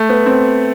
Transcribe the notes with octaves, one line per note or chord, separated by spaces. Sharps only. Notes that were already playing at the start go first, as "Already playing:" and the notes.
Already playing: A3
B3
C4